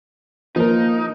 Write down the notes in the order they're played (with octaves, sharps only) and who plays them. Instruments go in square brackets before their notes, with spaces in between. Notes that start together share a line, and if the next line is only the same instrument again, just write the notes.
[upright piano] F3 A#4 [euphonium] A#3 [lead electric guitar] D#4